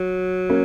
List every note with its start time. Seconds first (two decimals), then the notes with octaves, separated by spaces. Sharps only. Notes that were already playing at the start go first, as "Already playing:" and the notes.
Already playing: F#3
0.50 A#3 C#4